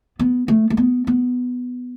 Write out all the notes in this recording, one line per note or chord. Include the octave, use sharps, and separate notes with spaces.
B3
A3
A3
B3
B3